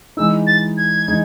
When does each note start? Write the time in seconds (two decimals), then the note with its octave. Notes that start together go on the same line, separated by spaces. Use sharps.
0.17 E3 G#3 D#4 E6
0.47 A6
0.77 G#6
1.08 E3 G#3 D#4